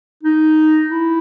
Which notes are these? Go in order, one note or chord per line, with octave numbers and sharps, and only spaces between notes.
D#4
E4